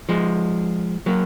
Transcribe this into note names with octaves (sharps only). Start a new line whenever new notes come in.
F3 G#3
F#3 A#3